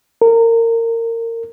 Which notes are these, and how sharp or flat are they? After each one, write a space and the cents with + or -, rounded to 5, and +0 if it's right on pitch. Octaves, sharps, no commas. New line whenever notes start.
A#4 -25